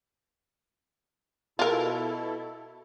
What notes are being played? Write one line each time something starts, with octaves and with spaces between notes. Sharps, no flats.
B2 E4 F4 A4 A#4